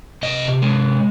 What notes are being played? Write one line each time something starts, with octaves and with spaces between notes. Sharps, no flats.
C3 D#5
G#3